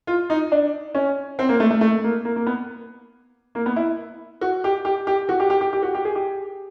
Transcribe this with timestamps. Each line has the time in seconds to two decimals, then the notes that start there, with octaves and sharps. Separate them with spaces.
0.07 F4
0.30 D#4
0.52 D4
0.95 C#4
1.39 C4
1.49 A#3
1.60 A3
1.70 A3
1.81 A3
2.04 A#3
2.25 A#3
2.36 A#3
2.46 B3
3.55 A#3
3.66 B3
3.76 E4
4.41 F#4
4.64 G4
4.85 G4
5.07 G4
5.29 F#4
5.40 G4
5.50 G4
5.61 G4
5.73 G4
5.83 F#4
5.95 G4
6.05 G#4
6.15 G4